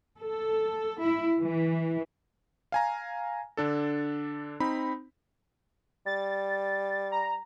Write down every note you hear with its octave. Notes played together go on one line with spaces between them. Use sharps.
A4
E4
E3
F5 G#5 A#5
D3 D4 A4
C4 D#4 B5
G3 A6
A#5